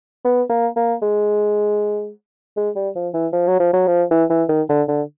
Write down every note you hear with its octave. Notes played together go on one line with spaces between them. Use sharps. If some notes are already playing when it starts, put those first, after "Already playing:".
B3
A#3
A#3
G#3
G#3
G3
F3
E3
F3
F#3
F3
F#3
F3
E3
E3
D#3
D3
D3